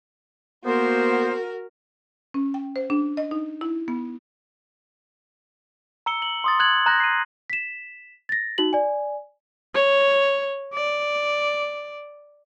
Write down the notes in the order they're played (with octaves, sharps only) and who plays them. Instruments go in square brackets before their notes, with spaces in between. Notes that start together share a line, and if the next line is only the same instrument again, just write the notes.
[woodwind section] A#3 B3 C5 [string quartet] F#4 A#4
[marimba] C#4
G5
C5
D4
D#5
D#4
E4
B3
[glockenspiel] A#5 E6 C#7 G7
F#7
C6 D#6 A6
F#6 G#6 F#7
A#5 F#6 G6 A#6
C7 D#7
[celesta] B6 E7
A6 A#6
D#4 F#4 F#7
D5 G#5
[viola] C#5
D5